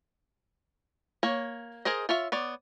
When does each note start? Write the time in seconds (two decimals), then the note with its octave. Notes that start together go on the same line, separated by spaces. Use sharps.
1.23 A#3 C#5
1.85 G#4 A#4 C5 D#5
2.09 F4 C#5 E5
2.32 B3 C#5 D5